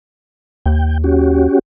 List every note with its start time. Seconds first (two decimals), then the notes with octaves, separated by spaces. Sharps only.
0.66 D#2 G5
1.04 C#4 F#4 G4